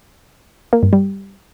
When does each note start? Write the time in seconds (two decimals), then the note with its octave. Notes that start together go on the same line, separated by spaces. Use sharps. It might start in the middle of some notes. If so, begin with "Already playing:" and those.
0.73 A#3
0.83 G2
0.93 G3